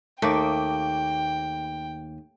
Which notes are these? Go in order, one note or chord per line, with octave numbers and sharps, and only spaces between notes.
D#2 A3 A#3 D5 G5